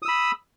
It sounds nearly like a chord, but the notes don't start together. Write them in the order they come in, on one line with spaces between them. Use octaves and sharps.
D#6 E6 B5